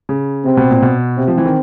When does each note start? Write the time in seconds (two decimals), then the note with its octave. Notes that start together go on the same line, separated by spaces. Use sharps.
0.09 C#3
0.45 C3 C4
0.57 B2
0.70 A#2
0.82 B2
1.18 C3 C4
1.28 F3
1.37 E3
1.45 D#3